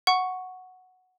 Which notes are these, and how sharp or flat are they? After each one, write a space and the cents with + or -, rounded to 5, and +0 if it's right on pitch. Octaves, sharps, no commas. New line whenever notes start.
F#5 +0 C#6 +0